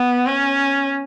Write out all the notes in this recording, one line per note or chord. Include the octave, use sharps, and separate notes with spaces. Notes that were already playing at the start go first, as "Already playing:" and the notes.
Already playing: B3
C#4